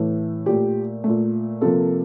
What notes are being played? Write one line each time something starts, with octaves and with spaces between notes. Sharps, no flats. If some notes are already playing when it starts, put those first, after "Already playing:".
Already playing: A2 E3 A3
A#2 A3 G4
A#2 A3
C3 F3 A#3 A4